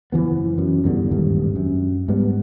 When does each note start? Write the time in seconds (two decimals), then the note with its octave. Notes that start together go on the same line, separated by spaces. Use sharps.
0.12 F#1 E3 F3 B3
0.58 F#2
0.84 E2 G2 D3
1.12 D#1 G#1 G2
1.56 F#2
2.08 G#2 G3 B3